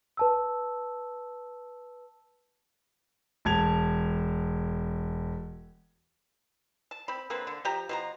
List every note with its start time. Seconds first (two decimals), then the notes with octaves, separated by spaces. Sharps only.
0.17 B4 A5 E6
3.45 E1 A5 G#6 F7
6.91 A5
7.08 C4 B5
7.30 D3 A#3 C4 B4
7.47 D3
7.65 F3 G4 A#5
7.89 B2 F3 A#5